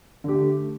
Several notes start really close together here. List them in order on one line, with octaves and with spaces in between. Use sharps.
D3 G4 A3